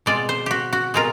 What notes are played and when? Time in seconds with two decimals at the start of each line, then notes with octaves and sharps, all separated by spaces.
0.06 B2 G#3 C4 F4 D5
0.29 C5
0.46 F#4 G4
0.73 F#4
0.94 B2 G#3 C4 F4 A#4